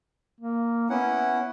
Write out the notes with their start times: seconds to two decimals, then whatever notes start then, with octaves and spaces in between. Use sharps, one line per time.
0.40 A#3
0.90 B3 C#4 E4 F#5